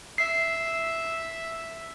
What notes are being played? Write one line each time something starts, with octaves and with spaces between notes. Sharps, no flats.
E5 C7